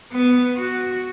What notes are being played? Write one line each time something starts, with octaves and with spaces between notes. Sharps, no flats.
B3
F#4